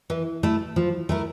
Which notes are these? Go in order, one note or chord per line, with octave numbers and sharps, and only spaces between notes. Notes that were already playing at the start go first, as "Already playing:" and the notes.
E3
A3 E4
F3
A3 E4 A#4